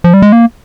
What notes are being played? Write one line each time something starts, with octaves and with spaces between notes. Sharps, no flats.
F3
G3
G#3
A#3